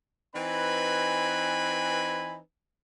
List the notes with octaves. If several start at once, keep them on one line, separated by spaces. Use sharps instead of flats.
E3 C4 D#4 B4 G#5 B5